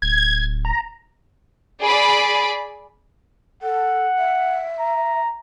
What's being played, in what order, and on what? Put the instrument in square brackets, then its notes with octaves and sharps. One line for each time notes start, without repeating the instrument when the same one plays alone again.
[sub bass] D1 [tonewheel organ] G#6
[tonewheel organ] A#5
[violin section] G#4 D5 B5
[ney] A4 [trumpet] F#5
[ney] E5
[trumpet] A#5